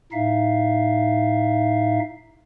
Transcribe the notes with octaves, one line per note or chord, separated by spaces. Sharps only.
A2 D#4 E5 F5